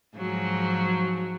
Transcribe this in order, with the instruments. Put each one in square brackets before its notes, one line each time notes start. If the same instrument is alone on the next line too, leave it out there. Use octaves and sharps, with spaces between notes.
[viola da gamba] G#2 F3 F#3